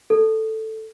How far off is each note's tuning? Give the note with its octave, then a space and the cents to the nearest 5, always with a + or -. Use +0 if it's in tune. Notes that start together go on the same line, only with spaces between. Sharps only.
A4 +0